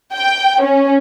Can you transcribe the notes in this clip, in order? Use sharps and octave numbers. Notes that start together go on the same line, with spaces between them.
G5
C#4